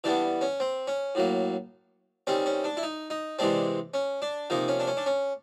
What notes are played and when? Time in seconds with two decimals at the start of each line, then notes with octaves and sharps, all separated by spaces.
0.04 E3 G3 B3 D4
0.41 C#4
0.60 C4
0.87 C#4
1.15 A2 F#3 A#3
2.27 D#3 G3 C4 C#4
2.46 C#4
2.64 D4
2.77 E4
2.83 D#4
3.10 D#4
3.39 C3 E3 G#3 C4 D4
3.94 C#4
4.22 D4
4.50 C3 F3 A#3 D#4
4.68 C#4
4.80 D4
4.87 C#4
4.97 D4
5.06 C#4